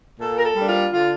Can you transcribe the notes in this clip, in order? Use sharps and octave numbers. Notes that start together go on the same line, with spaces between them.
A#2 A4
A#4
A4
G3 A#3 D4
F4
D3 F4